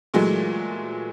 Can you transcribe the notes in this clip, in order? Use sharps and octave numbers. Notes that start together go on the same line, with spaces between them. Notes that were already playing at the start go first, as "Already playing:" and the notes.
A#2 E3 F#3 G#3 A3